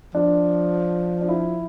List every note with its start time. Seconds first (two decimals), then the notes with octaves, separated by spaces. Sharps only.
0.14 F3 D4
1.21 D4
1.29 E4